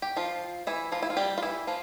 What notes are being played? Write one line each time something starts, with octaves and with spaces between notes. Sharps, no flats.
G4
F3 F4
E3 E4
F3 F4
E4
F4
G3 G4
F4
E3 E4
F3 F4